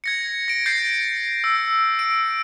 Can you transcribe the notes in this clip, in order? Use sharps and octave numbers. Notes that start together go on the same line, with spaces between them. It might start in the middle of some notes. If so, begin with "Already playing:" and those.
G#6 A#6 C#7
A#6 D7
G6 A6 A#6 C7
E6
D7